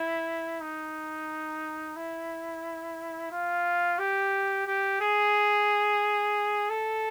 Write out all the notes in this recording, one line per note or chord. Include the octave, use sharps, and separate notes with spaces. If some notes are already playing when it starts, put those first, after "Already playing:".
Already playing: E4
D#4
E4
F4
G4
G4
G#4
A4